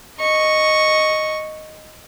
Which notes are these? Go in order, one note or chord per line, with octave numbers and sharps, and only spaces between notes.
D#5 C#6